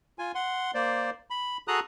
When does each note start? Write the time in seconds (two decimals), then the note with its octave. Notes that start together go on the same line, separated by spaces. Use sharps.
0.19 F4 G#5
0.35 F#5 C6
0.74 A#3 C5 D5
1.30 B5
1.68 F#4 G#4 A4 A#5 D#6 F#6